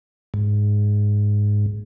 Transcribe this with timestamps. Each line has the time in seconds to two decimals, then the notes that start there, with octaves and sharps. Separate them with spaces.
0.34 G#2